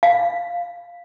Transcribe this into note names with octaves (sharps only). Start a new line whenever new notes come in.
F5